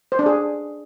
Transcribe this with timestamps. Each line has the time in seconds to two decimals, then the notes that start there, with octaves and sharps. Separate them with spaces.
0.12 C5
0.19 D4
0.26 G#4